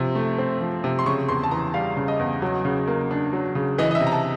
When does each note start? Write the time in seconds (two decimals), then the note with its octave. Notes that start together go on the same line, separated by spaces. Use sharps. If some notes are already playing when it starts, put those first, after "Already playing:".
Already playing: C3 F3
0.15 A3
0.38 C4
0.61 F3
0.84 C3
0.99 C6
1.06 C#3 C#6
1.28 E2 C6
1.44 A5
1.51 E3 A#5
1.74 G3 F5
1.97 C#3
2.08 D#5
2.19 E2
2.42 F#3
2.65 C#3
2.88 A#3
3.11 D4
3.33 F#3
3.55 C#3
3.78 E3 D#5
3.91 D#5
3.95 E5
4.00 C3
4.07 A#5
4.12 A5